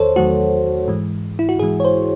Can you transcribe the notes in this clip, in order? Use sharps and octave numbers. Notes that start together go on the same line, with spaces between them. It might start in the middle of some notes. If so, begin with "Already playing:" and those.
Already playing: E2 D#3 A4 C5 C#5
E2 D#3 F#3 A3 F#4
G#2 E3 G#3
E4
F#4
G#2 E3 G#3 G#4
C#5
C5